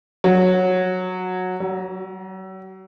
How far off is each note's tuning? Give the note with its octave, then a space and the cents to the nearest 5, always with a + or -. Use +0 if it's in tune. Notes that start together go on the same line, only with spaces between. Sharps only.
F#3 -10
F#3 +40